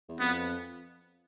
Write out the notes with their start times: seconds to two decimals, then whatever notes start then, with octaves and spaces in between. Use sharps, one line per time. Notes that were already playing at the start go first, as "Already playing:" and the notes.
0.08 E2
0.19 F2 B3